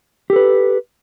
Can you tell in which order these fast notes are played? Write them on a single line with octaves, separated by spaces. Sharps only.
G4 A4 B4